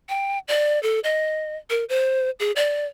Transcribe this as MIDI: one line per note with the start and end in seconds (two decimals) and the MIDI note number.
0.09 0.39 79
0.48 0.81 74
0.83 1.00 69
1.04 1.57 75
1.70 1.85 70
1.89 2.30 72
2.40 2.52 68
2.56 2.86 74